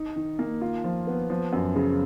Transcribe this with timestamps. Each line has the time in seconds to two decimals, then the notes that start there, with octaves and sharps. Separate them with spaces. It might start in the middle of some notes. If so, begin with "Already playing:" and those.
Already playing: D#4
0.16 D#3
0.39 A#3
0.61 F4
0.84 F3
1.07 B3
1.30 F3
1.53 F#2
1.76 C#3